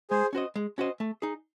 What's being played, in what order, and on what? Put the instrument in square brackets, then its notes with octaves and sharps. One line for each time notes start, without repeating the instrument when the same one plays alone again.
[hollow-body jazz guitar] G#3 [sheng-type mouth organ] G#4 C5
[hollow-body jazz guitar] C#4 F#4 C5 D#5
G#3
C#4 F#4 C5 D#5
A3
D#4 G#4